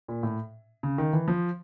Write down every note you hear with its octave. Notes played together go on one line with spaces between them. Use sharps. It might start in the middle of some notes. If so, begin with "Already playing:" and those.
A#2
A2
C#3
D#3
E3
F3